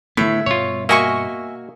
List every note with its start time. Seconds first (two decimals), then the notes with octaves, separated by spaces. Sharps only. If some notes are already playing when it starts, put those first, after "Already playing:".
0.17 A2 D3 A3 B3 E5
0.46 G2 B2 F4 C#5
0.89 A#3 F#4 D#5 E5 G#5 C#6